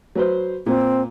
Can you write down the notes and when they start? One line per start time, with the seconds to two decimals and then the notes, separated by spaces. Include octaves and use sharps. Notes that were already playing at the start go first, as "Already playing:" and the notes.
0.15 F#3 B4 C5
0.66 A#2 C4